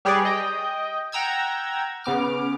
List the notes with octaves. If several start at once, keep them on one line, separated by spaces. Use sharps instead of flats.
G3 G4 G#4 B4 C#5 D5
D#5 G5
F#5 G5 A#5 E6 G#6
C#3 B3 D6 F6